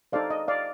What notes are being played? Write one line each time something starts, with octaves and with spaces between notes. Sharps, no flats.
D#4 A4 C5 D5 F5
D#5
D5 F5